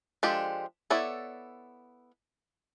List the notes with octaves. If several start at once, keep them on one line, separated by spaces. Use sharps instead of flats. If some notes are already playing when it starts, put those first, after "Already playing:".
F3 G#3 D4 G4 A4
B3 E4 A4 C#5 D5